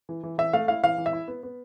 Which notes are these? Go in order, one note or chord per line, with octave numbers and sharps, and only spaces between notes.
E3
E3
E3 E5
A3 F5
E4 F5
E3 F5
E3
E5
E4
B3
B3